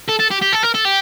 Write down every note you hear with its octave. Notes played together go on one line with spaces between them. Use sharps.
A4
A4
G4
G4
A4
A#4
A4
G4